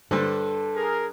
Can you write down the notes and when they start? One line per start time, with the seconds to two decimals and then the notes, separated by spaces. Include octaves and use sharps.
0.11 G2 D3 A4 C5
0.76 G#4 A#4